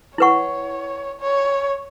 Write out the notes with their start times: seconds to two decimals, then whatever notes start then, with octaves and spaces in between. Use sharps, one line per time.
0.18 E4 B4 C#5 F#5 C#6
1.21 C#5